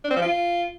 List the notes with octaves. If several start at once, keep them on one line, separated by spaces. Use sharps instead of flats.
D4
C4
F3
F4